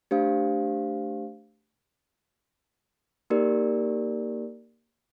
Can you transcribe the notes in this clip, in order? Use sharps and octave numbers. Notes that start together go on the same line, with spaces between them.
A3 D4 G4 C5 F5
A#3 D#4 G4 A#4 D5